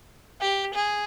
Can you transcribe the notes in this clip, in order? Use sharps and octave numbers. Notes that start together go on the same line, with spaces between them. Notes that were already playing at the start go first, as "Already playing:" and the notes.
G4
G#4